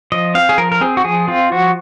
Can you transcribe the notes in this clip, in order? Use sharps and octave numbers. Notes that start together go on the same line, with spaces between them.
F3 D#5
C4 F5
G#4
F3 A#4
A#4
C4 G#4
F#4
F3 G#4
C4 F4
F3 F#4